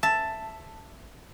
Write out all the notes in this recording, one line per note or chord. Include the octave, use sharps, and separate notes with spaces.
E5 A5